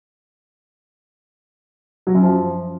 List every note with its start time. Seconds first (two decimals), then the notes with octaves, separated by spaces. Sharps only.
2.07 F#3
2.14 F#2
2.22 F3